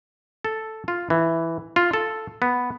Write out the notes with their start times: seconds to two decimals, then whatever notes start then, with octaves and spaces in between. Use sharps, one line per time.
0.44 A4
0.88 F4
1.10 E3
1.76 F4
1.93 A4
2.42 B3